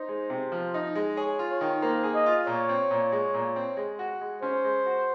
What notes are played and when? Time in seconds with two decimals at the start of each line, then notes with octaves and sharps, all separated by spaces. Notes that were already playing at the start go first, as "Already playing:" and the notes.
Already playing: D#4 C5
0.09 G#3
0.30 C3
0.52 F3
0.74 D#4
0.95 G#3
1.17 G#4 C#5
1.39 F4
1.50 C#5
1.61 D#3
1.82 A#3 C5
2.04 G#4
2.15 D#5
2.26 F4
2.47 A#2 C#5
2.69 C4
2.91 A#2
3.12 G#3
3.34 A#2
3.56 C4
3.77 G#3
3.99 F#4
4.21 G#3
4.42 C#4 C5
4.64 G#3
4.86 F#4